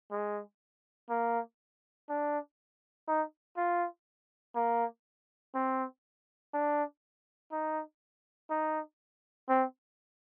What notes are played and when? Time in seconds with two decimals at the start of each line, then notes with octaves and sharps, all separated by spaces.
0.11 G#3
1.10 A#3
2.09 D4
3.08 D#4
3.57 F4
4.55 A#3
5.54 C4
6.53 D4
7.52 D#4
8.50 D#4
9.49 C4